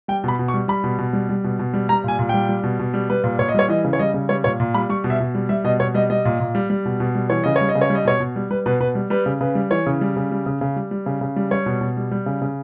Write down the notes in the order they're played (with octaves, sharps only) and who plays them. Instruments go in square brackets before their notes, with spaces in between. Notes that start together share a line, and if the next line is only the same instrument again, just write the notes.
[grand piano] G3 G5
B2 B5
B2
C#6
G3
G3 B5
B2
B2
G3
G3
B2
B2
G3
G3 A#5
A#2 G#5
A#2
G3 G5
G3
B2
B2
G3
G3 B4
A#2
A#2 C#5
D#5
G3 C#5
E3 D#5
C#3
C#5
G3 D#5
C#3
G3 C#5
A#2 C#5
A#2
G3 B5
G3 C#6
B2
E5
B2
G3
G3 E5
B2 D#5
B2 C#5
G3 D#5
G3 D#5
A#2
A#2
G3
G3
B2
B2
G3
E3 C#5
C#3 D#5
C#5
G3
D#5
C#3
C#5
G3
D#5
B2 C#5
B2
G3
G3 B4
B2 B4
B2 B4
G3
G3 B4
C#3
C#3 B4
G3
E3 C#5
C#3
G3
C#3
G3
C#3
C#3
G3
G3
C#3
C#3
G3
G3 C#5
B2
B2
G3
G3
C#3
C#3